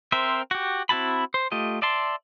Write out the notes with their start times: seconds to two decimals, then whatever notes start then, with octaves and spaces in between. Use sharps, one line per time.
0.12 C4 A#4 C5 E5
0.51 F#4 G4
0.89 C4 E4 F#4 A5 B5
1.34 C5
1.52 A3 F4 G4 D#5
1.82 D5 E5 A5 C6